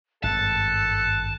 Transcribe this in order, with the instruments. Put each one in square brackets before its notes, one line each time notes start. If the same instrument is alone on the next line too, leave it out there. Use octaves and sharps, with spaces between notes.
[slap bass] G#1 G2 [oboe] A4 [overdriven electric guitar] A5 [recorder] F#6